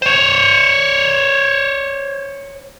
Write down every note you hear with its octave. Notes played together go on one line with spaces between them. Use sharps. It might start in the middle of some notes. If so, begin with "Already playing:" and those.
C5 C#5